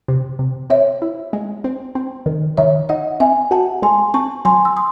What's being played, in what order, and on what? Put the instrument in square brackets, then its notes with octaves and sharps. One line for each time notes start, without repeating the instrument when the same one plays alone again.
[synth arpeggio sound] C3
C3
[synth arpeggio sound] C4 [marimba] C#5 E5
[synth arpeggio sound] E4
G#3
C4
C4
D#3
[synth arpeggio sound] D#3 [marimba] C#5 E5
[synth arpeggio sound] D#4 [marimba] D#5 F#5
[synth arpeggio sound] C4 [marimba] E5 G#5
[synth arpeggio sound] F#4 [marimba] F#5 A5
[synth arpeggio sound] G#3 [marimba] G#5 C6
[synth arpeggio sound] C4 [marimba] A5 C#6
[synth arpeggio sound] F#3 [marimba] G#5 C6
[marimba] E6
C6 D#6